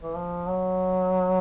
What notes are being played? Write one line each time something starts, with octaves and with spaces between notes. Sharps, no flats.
E3
F3
F#3